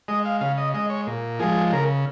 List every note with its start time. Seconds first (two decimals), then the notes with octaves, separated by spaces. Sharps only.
0.08 G#3 D#5
0.25 F5
0.41 C#3 F5
0.57 D#5
0.74 G#3 D#5
0.90 C#5
1.07 A#2
1.39 F3 G#3 G#4
1.73 C#3 A#4